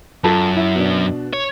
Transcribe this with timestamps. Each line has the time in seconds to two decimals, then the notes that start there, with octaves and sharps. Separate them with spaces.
0.24 F#2 F4 A4 A5
0.56 E4
0.75 B2 D4
1.33 C#5